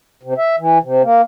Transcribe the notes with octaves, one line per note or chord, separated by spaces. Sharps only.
C3
E5
E3
C3
A#3